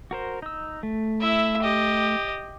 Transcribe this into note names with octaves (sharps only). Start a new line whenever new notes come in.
F#4 A#4 C5
D#4 E6
A3
E4 E5
G4 D#5